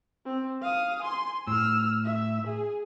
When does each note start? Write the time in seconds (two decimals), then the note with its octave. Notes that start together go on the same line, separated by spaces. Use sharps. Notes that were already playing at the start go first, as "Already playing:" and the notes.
0.25 C4
0.61 F5 D#6
1.02 G#5 C6
1.47 A2 E6 F6
2.04 E5
2.47 G#4